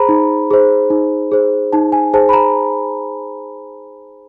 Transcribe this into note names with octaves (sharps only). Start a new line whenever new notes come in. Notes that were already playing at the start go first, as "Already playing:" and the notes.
Already playing: G#4 C5 A#5 B5
D#4
G#4 C5
D#4
G#4 C5
D#4 A5
G#5
G#4 C5 A5
B5
A#5